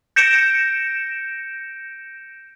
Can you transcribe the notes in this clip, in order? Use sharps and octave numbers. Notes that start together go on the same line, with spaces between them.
G6 A#6 C#7 D7 E7